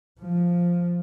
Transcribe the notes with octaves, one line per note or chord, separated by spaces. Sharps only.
F3